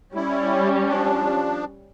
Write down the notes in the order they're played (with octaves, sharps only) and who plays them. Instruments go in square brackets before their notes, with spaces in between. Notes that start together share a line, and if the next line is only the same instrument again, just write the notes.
[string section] G3 C#4 [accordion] E4
[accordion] F3 D4